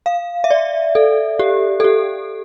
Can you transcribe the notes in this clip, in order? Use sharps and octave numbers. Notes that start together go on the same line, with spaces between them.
F5
E5
D5
A4
G4
A4
G4